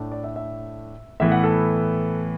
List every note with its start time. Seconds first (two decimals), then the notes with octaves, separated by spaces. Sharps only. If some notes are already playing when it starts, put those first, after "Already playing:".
Already playing: A2 A3 D4
0.12 D5
0.24 E5
0.36 E5
1.20 A2 E3 B3 E5
1.32 F#5
1.44 A4